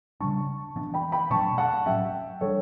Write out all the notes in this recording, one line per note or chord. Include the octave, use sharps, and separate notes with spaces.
C#3 G3 D4 A5 C#6
E3 B3 D4
G5 B5
G5 B5
B2 F#3 A3 D4 A5 C#6
F#5 A5
A2 F#3 C#4 E5 G5
E3 G3 D4 A4 C#5